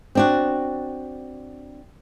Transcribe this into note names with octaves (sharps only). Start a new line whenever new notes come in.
C4 D4 F#4